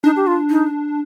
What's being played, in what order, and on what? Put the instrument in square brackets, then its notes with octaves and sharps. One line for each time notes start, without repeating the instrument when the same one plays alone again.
[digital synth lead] D4 [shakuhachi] D#4
[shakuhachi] G4
F4
D#4